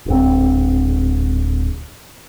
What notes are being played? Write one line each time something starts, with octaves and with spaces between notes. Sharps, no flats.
D1 G#2 C4